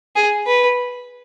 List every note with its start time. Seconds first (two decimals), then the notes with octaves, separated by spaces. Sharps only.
0.16 G#4
0.47 B4